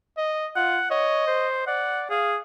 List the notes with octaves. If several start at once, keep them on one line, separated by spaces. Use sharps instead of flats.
D#5
F4 F#5
C#5 D#5
C5
D5 F#5
G#4 F5